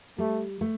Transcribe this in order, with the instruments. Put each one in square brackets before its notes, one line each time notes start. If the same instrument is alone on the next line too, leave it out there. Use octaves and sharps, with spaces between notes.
[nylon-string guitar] G3 [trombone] A3
[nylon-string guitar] A3